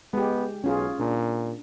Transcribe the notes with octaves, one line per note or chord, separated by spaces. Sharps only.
G#3 B3 G4
B1 C#4 F4 G#4
A#2 D4